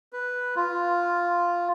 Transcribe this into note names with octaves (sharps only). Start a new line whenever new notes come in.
B4
F4